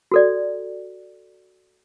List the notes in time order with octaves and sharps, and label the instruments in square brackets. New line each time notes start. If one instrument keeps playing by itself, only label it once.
[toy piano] F#4 A4 D5